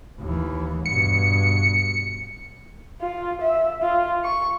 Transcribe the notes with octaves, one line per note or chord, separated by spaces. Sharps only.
D#2 E3
G2 B2 C#7
F4
E5
F4
C#6